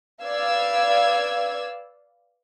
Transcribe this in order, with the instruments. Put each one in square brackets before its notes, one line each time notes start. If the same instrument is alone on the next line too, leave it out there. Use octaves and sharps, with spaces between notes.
[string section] B4 D5 F5 E6 G#6